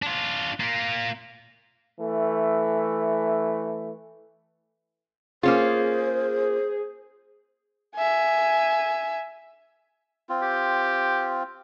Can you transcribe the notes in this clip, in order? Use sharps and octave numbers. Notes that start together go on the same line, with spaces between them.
D4 F4
A#3 F4
E3 A3
A#3 C#4 F4 G#4 C5
E5 G#5
C4 F4
G4